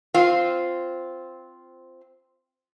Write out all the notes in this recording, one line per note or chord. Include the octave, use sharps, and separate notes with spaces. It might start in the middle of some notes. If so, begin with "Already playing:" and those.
C4 F4